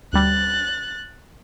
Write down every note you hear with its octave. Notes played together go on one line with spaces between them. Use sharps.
D2 G3 F#6 A6